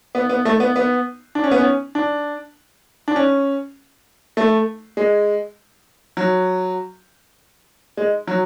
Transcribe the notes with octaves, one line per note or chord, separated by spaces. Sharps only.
B3
B3
A3
B3
B3
D4
C#4
B3
C#4
D4
D4
C#4
A3
G#3
F#3
G#3
F#3